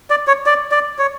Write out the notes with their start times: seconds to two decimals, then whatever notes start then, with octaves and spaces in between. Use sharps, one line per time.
0.10 D5
0.27 C#5
0.46 D5
0.71 D5
0.99 C#5